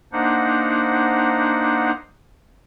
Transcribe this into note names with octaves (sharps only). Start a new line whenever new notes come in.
A#3 D4 D#4 C5 F#5